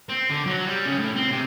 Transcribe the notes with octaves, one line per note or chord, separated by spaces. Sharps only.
C4
D3
F#3
G3
C#3
A2
C4
C3